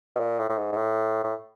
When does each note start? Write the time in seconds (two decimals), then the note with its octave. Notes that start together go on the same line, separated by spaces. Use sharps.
0.16 B2
0.20 A#2
0.39 A2
0.50 A2
0.58 G#2
0.72 G#2
0.77 A2
1.24 A2